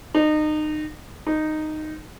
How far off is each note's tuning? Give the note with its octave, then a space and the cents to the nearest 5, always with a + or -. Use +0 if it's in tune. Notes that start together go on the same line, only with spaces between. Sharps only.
D#4 -30
D#4 -10